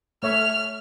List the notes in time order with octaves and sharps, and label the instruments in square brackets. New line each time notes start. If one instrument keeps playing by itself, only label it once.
[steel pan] A3 C#5 E5 [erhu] F6